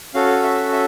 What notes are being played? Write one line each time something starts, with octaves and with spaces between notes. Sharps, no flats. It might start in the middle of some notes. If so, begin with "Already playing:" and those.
C#4 F#4 A4 F5
E5
E5